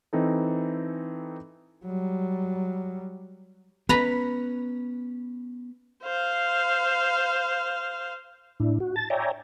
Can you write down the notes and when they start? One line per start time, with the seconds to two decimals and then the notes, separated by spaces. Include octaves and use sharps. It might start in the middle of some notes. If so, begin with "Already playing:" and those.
0.13 E3 C4 D#4 A4
1.85 F#3 G3
3.89 B3 C#4 B4 A#5 B5
6.03 C5 F5
8.60 A2 D4 E4
8.80 F#4
8.96 A5 A6
9.10 C#5 D5 E5 G5 G#5 A#5